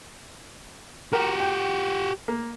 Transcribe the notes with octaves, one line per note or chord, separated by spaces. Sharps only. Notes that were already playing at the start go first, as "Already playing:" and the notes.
F#4 G4 A#4
G5
A#3